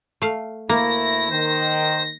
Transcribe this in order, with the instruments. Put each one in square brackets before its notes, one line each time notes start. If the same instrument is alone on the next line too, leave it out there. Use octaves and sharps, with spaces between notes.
[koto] A3 F5
[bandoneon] D2 A3 E4 [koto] A#3 [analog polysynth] A#6
[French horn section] D#3 [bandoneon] C5